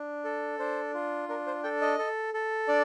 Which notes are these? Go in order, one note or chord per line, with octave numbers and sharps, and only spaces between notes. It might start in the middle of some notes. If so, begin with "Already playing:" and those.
Already playing: D4
A4
D4 C5
F4
D4 A#4
C5
A4 G5
D#5
A4
A4
D4 D5